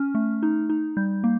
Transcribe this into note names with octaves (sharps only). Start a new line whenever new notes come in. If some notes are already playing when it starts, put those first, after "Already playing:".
Already playing: C#4 F6
A3
D#4
D#4
G3 G6
A#3